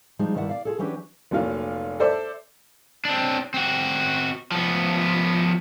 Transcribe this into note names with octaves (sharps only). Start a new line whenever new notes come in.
F3 G3 G#3 D#4
G2 D#3 E4 D5 E5 F#5
D5 F5
F4 G#4 A4
E3 F#3 C#4 D4 G4 B4
F1 A#2 F#3 F4
A4 C5 D5 E5
C4 D4
C4 F#4
F3 B3